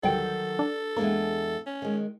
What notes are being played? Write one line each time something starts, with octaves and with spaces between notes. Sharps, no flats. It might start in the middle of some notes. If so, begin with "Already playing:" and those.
D2 D#3 F#3 G3 A4 G5
D4
E2 G#3 A#3 D4
C#4
D#3 G#3